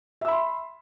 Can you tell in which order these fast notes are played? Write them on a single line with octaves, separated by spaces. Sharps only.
E5 E6 B5 C6